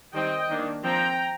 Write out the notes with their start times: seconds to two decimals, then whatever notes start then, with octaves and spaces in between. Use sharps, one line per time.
0.13 D#3 G3 C4 D#5 G5
0.49 D#3 A#3 D4
0.84 F3 C4 G5 A#5